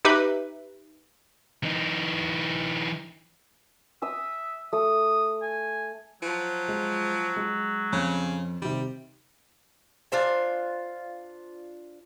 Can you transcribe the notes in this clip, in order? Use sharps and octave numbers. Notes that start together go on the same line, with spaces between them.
D#4 G4 B4 E5
E3 D#4
E5 D#6 E6
A3 D#6
G#5
F3 F#3
G#3
G#3
F2 C#3
C3 D#3 G3
D4 F4 C5 G#5